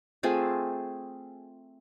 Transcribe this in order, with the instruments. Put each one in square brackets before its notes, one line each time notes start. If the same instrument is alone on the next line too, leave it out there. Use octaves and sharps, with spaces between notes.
[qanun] A3 C4 F4 G#4